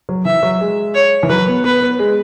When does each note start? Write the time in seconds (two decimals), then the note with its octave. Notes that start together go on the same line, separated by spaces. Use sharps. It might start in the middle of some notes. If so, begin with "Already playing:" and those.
0.09 F#3
0.25 E3 E5
0.43 F#3
0.61 G#3
0.94 C#5
1.23 E3
1.29 F#3 B4
1.47 B3
1.64 B3 B4
1.82 B3
1.99 G#3